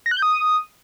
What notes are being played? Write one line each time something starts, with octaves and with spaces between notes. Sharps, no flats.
A#6
F#6
G6
D#6